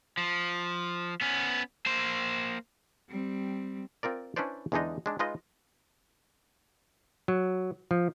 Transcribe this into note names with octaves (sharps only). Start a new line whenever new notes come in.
F3
B3 C#4
A#3 C5
G3 C4
C4 F4 A#4 D5
C#4 D4 E4 B4 C5 D5
E2 D3 G#3 D4 D#4 D#5
G#3 D4 D#4
G#3 D#4 F4 B4 D#5
F#3
F3